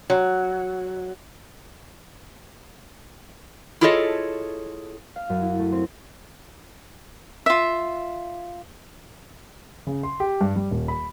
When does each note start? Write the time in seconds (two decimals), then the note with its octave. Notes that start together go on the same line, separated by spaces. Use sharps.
0.10 F#3
3.81 E4 F4 G#4 A4 C#5 D#5
5.16 F5
5.29 F#2
5.42 E4
5.59 A3
5.72 C4
7.46 F4 E5
9.87 C#3
10.03 C6
10.20 G4
10.41 G2
10.56 G3
10.71 D#1
10.88 B5